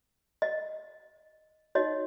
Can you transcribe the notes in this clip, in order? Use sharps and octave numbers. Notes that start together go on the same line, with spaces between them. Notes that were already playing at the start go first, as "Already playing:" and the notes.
D#5
D#4 F#4 C#5 D#5